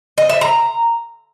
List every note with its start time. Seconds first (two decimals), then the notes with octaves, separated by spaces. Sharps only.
0.18 D#5
0.30 E5
0.41 A#5